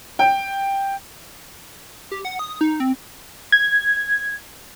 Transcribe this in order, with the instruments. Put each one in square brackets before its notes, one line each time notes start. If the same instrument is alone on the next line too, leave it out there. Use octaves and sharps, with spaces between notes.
[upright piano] G5
[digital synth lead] G4
F#5
D#6
D#4
C4
[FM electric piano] G#6